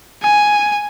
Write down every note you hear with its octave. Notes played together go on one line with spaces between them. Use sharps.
G#5